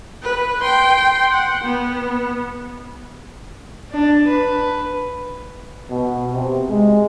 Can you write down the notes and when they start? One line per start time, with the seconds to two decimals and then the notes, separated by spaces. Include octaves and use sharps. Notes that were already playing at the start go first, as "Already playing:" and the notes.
0.23 B4
0.61 G5 C6
1.31 F#5
1.63 B3
3.91 D4
4.27 B4
5.91 B2
6.33 C3
6.69 G#3